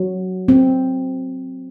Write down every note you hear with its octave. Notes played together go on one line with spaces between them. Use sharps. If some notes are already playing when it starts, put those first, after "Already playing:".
Already playing: F#3
C4